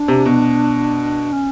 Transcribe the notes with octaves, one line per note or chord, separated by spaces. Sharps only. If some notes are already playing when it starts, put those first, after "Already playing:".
Already playing: D4
C3
B2
C#4